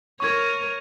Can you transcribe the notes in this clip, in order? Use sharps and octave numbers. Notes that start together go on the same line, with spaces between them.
A#4 C#5 C#6 G#6